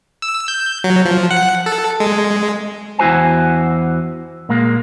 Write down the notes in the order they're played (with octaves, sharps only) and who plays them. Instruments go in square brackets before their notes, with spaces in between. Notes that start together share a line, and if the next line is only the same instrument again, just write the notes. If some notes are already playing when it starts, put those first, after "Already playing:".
[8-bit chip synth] E6
G6
F#3
F3
F#5
A4
G#3
[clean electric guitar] E2 E4 F#4 C5 G#5
A#2 G#3 A#3